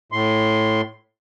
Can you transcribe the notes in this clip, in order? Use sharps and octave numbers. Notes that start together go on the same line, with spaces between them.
A2 C6